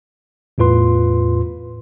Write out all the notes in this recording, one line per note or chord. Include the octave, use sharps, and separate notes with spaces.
E2 A2 F4 B4 C6